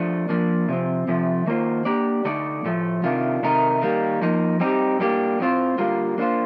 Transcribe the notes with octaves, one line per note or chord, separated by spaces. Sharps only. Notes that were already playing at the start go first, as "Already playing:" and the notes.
Already playing: F3 A3 D4
F3 A#3 D4
C3 F3 C4
C3 F3 A3
D#3 A#3 F4 C5
A#3 D4 G4 D5
D3 A3 D#4 A4 D5
A2 F3 A3
C3 D#3 A3 D4 F4
C3 D#3 A3 D#4 A#4
D#3 G3 A#3
F3 A#3 D#4
G3 C4 D#4 G4
A2 G3 A#3 D4 G4
A2 G3 C4 F4 C5
D3 G3 A#3 F4
A#3 D4 F4 C5